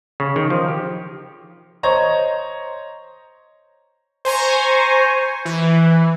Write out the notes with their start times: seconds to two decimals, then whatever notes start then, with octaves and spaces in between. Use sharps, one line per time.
0.20 C#3
0.36 D#3
0.50 F3
0.68 G4
1.83 C5 C#5 D#5 A#5 C#6
4.25 C5 G#5 A#5 C#6
5.45 E3